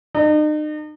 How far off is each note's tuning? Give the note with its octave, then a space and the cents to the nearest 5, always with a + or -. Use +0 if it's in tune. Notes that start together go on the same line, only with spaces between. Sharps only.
D#4 -40